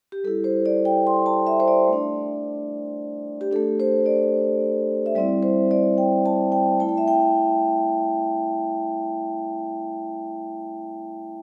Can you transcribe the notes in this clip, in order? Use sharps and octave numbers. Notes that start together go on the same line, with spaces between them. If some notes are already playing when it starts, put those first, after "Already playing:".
G4
G3 E4 A4
C5
D5
G5
C6
A5
E5
C5
D5
A3
D4
G4
A3 D4 A4
C5
D5
E5
G3 C4 E4 D5
C5
D5
G5
A5
G5
A3 E4 A5
G5
E5
G5